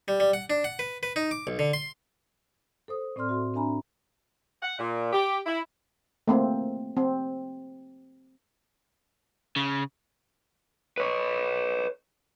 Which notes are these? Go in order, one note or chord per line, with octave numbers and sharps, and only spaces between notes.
G3
G3
F#5
D4
F#5
B4
B4
D#4
D6
B1
D3
C6
A4 C5 D#6
A2 C4 D5 C6 F6
F#4 E5 C6
C4 D4 E5 G#5 A#5 B5
F#5
A#2
G4
E4
A3 A#3 C4
C4
C#3
B4 C#5